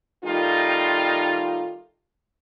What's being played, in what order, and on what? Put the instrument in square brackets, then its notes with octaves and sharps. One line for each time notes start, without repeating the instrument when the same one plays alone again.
[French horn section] D#3 G3 A3 D#4 F4